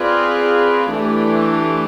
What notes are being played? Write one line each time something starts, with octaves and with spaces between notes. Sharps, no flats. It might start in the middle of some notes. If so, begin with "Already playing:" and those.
Already playing: C4 F4 G#4 B4 D5
E3 A3 D4 G4